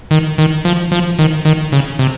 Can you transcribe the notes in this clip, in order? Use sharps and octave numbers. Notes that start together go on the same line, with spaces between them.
D#3
D#3
F3
F3
D#3
D#3
C#3
C3